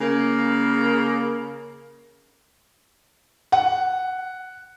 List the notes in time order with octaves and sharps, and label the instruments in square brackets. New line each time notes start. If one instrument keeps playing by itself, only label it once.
[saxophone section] C#3 A#3
[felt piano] F#5